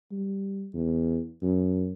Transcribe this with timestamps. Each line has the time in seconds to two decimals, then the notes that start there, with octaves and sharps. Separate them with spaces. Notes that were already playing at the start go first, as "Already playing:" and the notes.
0.11 G3
0.74 E2
1.42 F#2